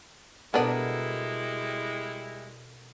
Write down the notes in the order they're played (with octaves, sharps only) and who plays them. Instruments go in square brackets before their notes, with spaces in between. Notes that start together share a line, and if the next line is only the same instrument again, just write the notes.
[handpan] B2 A4 A#4 [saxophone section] G3 G#3 E4 [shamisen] B3 D4